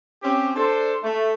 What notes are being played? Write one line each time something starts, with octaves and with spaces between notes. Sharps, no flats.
C4 C#4 G4
D4 A4 C5
A3